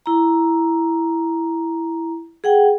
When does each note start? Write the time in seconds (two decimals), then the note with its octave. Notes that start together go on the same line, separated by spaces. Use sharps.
0.06 E4 A#5
2.44 G#4 F#5 G5